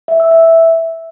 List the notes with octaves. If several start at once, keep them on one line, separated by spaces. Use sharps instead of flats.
E5
E6
E5